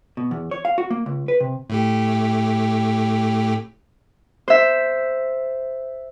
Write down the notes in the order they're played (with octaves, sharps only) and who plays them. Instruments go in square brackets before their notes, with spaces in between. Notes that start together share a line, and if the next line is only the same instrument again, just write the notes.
[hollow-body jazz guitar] B2
E2
C#5
F5
F#4
A#3
C#2
B4
C3
[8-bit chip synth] A2 A3 G4
[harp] C5 E5